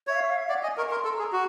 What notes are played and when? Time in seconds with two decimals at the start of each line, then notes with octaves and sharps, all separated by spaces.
0.07 C#5 E5
0.15 F5
0.23 E5
0.29 F5
0.37 E5
0.49 D5 F#5
0.63 D#5 G#5
0.77 A#4 C#6
0.88 C#6
0.91 A#4 C6
1.04 A4
1.11 A#5
1.19 G#4
1.32 F#4